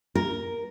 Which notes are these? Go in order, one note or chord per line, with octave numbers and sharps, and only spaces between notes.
A#4